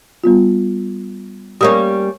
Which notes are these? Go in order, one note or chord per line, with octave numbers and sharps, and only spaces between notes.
G3 B3 F4
G3 A#3 C#4 D#6